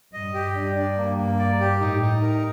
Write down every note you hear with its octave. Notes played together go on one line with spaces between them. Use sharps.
G2 D#5
G4
G2 D4
D4
A#3
A#3
D5
G4
A2 D#4
D#4
A#4